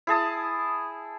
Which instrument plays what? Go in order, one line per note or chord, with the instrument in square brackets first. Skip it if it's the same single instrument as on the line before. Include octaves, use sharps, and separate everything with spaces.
[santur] E4 G#4 A5 D#6